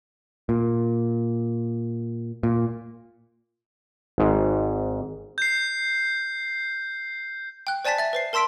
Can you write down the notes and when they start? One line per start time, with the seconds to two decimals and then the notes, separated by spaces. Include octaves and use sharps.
0.49 A#2
2.43 A#2
4.18 G#1 G#2
5.38 G6 C7
7.67 G5 F#6
7.85 C5 D5 G#5 A5 A6 B6
7.98 E5 A6
8.13 B4 C5 C7
8.33 A#4 A5 C6 E6 B6 D7